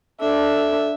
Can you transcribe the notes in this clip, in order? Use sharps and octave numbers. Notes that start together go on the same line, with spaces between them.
D4 A4 E5